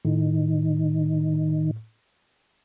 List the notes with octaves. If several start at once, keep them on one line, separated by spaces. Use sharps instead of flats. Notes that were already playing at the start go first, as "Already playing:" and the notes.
A2 D#3